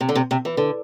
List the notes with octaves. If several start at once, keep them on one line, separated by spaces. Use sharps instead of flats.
C3
D3
C3
C3
E3
D3